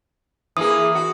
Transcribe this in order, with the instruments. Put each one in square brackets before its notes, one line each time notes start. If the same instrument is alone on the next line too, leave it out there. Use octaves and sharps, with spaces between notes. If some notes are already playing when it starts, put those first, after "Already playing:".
[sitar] E3 A#3 G#4 [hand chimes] D#6
[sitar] F#4